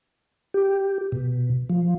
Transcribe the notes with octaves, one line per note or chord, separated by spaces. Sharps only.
G4
B2
F3